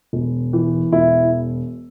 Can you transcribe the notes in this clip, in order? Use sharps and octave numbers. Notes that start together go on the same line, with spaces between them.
E1
E3
E1 E4